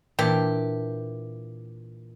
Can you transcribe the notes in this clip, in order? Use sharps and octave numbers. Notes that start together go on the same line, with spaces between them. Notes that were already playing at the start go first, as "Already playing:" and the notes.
A#2 E3 D4 G4